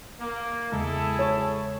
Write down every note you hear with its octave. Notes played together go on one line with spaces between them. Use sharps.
A#3
E2 C#3 G#3 E4 G#4 A4
C#5